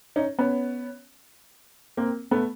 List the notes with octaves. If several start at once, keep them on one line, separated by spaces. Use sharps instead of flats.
C#4 D#4
B3 C#4
A#3 C4
A3 B3